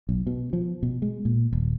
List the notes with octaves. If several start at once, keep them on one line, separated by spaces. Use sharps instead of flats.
B1
B2
F3
B2
G#3
A#2
D#1